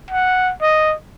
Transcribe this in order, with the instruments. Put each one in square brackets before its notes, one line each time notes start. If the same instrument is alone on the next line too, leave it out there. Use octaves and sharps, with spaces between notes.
[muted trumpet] F#5
D#5